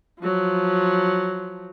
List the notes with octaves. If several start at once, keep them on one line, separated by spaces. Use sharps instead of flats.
F3 F#3